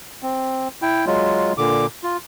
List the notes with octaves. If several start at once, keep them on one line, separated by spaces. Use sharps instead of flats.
C4
E4 G5
F#3 G#3 F4
A#2 D3 D6
F4